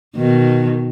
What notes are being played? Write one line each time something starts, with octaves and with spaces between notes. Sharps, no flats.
B2 D#3